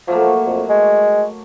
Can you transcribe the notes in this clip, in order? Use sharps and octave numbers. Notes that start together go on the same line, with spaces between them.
F3 F#3 A3 A#3
F2
G#3